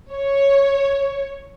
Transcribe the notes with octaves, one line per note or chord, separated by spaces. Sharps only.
C#5